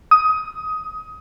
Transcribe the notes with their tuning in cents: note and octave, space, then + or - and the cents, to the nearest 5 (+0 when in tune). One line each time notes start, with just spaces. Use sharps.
D#6 +15